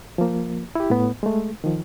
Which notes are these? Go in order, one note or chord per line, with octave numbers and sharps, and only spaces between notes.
F3 A#3
E4 G4
A2 B3
G#3 A3
D#3 F3